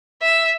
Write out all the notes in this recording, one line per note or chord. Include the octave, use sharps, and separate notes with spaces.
E5